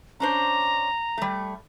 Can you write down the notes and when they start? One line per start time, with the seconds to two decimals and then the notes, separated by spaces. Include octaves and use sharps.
0.20 C#4 D4 C5 A#5
1.18 G3 A3